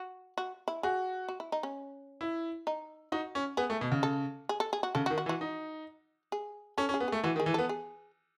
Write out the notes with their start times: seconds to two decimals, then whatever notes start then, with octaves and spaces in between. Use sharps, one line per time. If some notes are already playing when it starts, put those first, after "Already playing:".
Already playing: F#4
0.38 F#4
0.68 E4
0.83 F#4 G#4
1.29 F#4
1.40 E4
1.52 D#4
1.63 C#4
2.21 E4
2.67 D#4
3.12 D#4 F#4
3.35 C#4
3.57 B3 G#4
3.70 A3
3.81 B2
3.92 C#3
4.03 A4
4.49 G#4
4.60 A4
4.73 G#4
4.83 F#4
4.95 C#3 A4
5.06 F#4
5.10 D#3
5.18 F#4
5.26 E3
5.29 F#4
5.41 D#4
6.32 G#4
6.78 C#4 A4
6.89 C#4
6.94 G#4
7.00 B3
7.08 A3 G#4
7.24 E3 F#4
7.36 D#3
7.40 G#4
7.46 E3
7.54 B3 A4
7.69 G#4